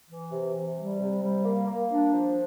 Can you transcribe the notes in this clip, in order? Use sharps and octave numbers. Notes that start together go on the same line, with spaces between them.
E3
C3
C3
G3
C3
G3
A#3
A#3
D4
F3